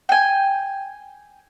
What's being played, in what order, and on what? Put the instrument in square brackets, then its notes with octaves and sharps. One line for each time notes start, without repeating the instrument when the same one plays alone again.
[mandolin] G5 G#5